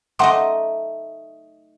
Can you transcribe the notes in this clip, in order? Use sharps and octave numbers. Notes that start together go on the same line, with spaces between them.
A3 D#4 D#5 F#5 C6 D6